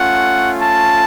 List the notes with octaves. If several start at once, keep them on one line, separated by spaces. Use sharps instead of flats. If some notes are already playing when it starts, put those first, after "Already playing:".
Already playing: A3 C#4 F4 F#5
A5